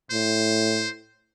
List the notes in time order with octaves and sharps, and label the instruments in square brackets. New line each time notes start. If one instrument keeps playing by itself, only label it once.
[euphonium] A2 [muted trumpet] C5